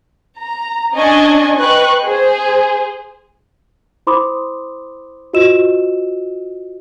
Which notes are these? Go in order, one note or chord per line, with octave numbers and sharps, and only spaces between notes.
A#5
C#4 D4 D#5 G#5 C#6
B4 C5 D#5 G5 C#6 F#6
G#4 C5
E4 C5 B5 C6 D6 D#6
F4 F#4 C5 D#5 E6 E7